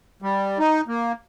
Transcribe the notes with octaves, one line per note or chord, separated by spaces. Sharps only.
G3
D#4
A#3